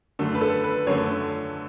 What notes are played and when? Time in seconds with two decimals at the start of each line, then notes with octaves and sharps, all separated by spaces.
0.19 F#2 D3 A3
0.35 B4
0.41 A4
0.64 B4
0.87 F#2 D3 A3 C#5